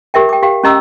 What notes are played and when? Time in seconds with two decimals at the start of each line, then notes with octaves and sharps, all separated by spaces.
0.14 G4 A#4 E5 G5
0.29 G5 D6
0.43 G4 F5 G5
0.63 C#4 G4 D#5 A#5 D6 E6